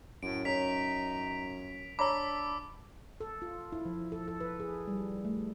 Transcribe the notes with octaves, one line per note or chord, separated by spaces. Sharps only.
F#2 A2 D7
C#4 D#4 B6 F7
D4 C#5 A#5 B5 D6 E6
A4
F4
E4
F3
A4
A4
B4
G#4
G3
A3